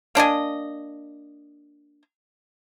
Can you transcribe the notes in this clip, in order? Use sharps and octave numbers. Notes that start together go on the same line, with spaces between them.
A#3 D4 D#5 G#5